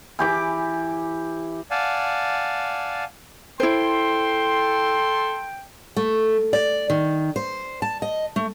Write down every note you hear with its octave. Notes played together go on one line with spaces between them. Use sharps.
E3 G4 D6
D5 F5 F#5 G#5 A5
E4 A4 C5 G5 C6
A3
D5
D#3
C5
A5
D#5
A3